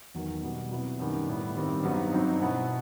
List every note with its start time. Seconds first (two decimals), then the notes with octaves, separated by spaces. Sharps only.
0.14 E2 D#3 F#3
0.42 B2 G3 B3
0.71 C3 F#3 B3 E4
0.99 F#2 D#3 G3 B3
1.27 A2 G3 B3 E4
1.55 G2 D#3 G3 C4
1.83 G2 F#3 B3 D#4
2.11 G2 F#3 C4 D#4
2.40 B2 F#3 B3 E4